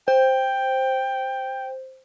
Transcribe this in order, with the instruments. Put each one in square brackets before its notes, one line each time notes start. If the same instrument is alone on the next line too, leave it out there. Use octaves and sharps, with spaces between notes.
[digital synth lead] C5 [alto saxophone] G5